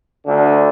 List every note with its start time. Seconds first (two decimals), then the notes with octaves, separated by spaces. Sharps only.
0.25 D2 D3